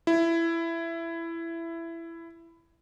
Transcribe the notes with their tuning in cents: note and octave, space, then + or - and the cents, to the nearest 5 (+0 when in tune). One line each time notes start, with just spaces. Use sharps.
E4 +15